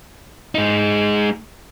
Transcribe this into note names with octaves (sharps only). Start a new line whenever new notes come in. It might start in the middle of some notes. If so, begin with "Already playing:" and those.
G#3 D#4